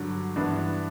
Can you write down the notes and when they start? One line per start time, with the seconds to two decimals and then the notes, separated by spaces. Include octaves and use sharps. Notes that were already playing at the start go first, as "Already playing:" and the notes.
Already playing: G2 D3 F#3
0.36 G2 E3 B3 D4